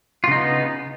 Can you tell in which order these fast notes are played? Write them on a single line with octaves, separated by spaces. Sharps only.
F4 C#3 D#4 B3